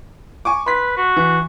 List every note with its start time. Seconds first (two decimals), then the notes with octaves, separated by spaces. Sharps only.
0.45 G#5 C#6 D6
0.66 B4 C6 B6
0.97 F#4
1.16 E3